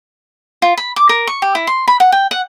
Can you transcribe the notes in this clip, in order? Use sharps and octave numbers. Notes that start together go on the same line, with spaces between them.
F4
B5
D6
A#4
C#6
G4
E4
C6
B5
F#5
G5
F#5